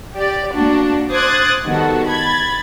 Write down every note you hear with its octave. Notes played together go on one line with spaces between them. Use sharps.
G4 D5
A#3 D4 F#4
C5 D6 D#6 F#6 G#6 A6
D#3 G3 B3 F#4 A4
B5 G#6 A6